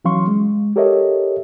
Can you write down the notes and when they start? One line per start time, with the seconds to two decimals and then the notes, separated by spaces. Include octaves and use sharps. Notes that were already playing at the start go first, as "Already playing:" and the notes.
0.05 E3 F#3 C#4 F5 C6 C#6
0.28 G#3
0.76 G4 A4 A#4 C#5 D#5 E5